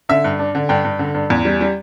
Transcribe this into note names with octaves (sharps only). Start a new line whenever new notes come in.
D3 E5
G2
D4
D3
G2 G5
G2
D3
G2
E2
G3
G3